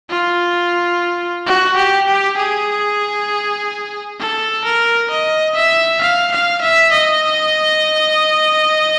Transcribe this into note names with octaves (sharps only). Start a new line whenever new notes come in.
F4
F#4
G4
G4
G#4
A4
A#4
D#5
E5
F5
F5
E5
D#5